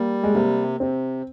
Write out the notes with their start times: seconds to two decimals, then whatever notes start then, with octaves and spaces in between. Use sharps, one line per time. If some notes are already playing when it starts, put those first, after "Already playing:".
Already playing: G3 A#3
0.23 G#3
0.34 C3 A#3
0.80 C3 C4